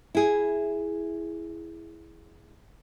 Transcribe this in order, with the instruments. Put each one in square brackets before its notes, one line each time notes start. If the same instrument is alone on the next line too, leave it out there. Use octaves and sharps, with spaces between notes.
[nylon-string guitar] E4 G#4